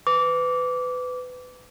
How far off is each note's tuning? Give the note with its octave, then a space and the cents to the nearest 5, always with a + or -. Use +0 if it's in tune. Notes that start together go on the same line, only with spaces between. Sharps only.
B4 +25 D6 -20